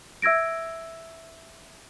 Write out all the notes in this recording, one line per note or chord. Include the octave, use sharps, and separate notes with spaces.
E5 E6 G#6 A#6 D7